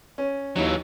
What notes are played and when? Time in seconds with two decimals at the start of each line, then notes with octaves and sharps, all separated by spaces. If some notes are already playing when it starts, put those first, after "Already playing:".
0.18 C#4
0.56 D#2 E3 F#3 D#4 C#5